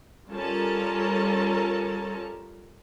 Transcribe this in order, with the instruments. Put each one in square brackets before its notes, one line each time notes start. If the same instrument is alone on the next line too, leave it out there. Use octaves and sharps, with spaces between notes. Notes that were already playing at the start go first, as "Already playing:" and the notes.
[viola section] G3 C#4 F4 A4 A#4 A5